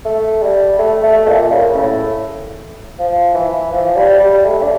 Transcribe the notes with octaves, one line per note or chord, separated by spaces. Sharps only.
A3
G3
A3
A3
A#2
C#3
A2
F3
E3
F3
G3
G3
A3
D4